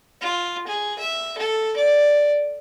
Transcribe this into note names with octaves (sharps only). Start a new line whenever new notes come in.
F4
G#4
E5
A4
D5